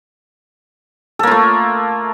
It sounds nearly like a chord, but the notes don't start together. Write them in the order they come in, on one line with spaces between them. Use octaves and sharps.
A4 A#3 F4 A3